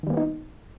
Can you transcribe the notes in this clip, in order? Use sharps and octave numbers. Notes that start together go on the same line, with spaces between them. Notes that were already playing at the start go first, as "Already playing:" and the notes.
D#3 G3 A#3 B3 D#4